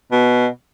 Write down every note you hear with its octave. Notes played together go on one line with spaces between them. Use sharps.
B2